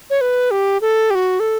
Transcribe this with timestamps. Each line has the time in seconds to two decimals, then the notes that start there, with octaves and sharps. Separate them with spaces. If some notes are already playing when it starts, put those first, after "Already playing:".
0.10 C#5
0.21 B4
0.51 G4
0.81 A4
1.10 G4
1.15 F#4
1.40 A4